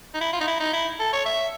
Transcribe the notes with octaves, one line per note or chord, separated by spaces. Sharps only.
D#4
E4
F4
D#4
E4
D#4
E4
A4
C#5
E5